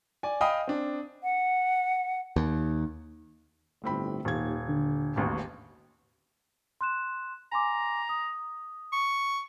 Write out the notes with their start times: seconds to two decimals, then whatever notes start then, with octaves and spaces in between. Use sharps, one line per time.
0.23 D5 G#5
0.41 D#5 F5 G5 B5 D#6
0.67 C4 D4
1.23 F#5
2.36 D#2
3.84 G1 A2 C4 B5
4.25 D#1 D#2 G#6
4.68 D3
5.16 E1 A1 D#2
6.81 C6 F#6 E7
7.52 G#5 A#5 C6 D6
8.09 D#6
8.93 C#6